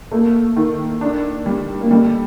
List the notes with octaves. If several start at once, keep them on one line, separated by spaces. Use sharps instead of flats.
A3 A#3
D#3
D4
G3
A#3
G3 A3